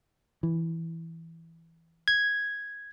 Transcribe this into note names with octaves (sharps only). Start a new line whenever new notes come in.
E3
G#6